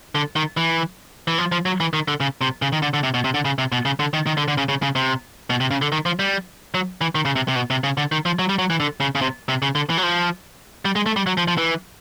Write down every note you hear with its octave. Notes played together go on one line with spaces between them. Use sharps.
D3
D#3
E3
E3
F3
F3
F#3
E3
D#3
D3
C#3
C3
C#3
D#3
D3
D3
C3
B2
C3
D3
C#3
C3
B2
C#3
D3
D#3
D#3
D3
D3
C#3
C#3
C#3
C3
B2
C3
C#3
D3
D#3
F3
G3
F#3
E3
D#3
C#3
C3
C3
B2
C3
C#3
D3
D#3
F3
F#3
G3
F#3
E3
D3
C#3
C#3
C3
C3
C#3
D3
E3
F#3
F3
G3
G#3
A3
G3
F#3
F3
F3
E3